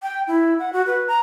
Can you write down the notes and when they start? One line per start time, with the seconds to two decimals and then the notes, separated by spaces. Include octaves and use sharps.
0.02 G5
0.27 E4
0.59 F#5
0.73 F#4
0.86 B4
1.08 A#5